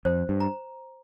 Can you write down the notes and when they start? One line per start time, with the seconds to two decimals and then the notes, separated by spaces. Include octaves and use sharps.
0.05 F2 C5
0.29 G2
0.40 A#5